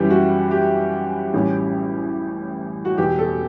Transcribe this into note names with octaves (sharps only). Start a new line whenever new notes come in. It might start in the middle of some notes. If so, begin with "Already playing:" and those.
Already playing: F#2 E3 G3 C#4 E4 G4
F#4
G4
A1 A2 G3 C#4
F#4
E1 E2 B2 G4
A4